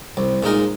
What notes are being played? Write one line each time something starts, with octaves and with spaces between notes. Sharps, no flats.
C2
A#2 G#3 D#4 A#4